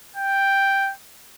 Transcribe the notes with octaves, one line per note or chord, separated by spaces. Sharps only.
G5